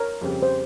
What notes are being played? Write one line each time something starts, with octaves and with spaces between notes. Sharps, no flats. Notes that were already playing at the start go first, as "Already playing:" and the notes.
Already playing: A#4 C#5
F2 C#3 G3 C4 G4
C5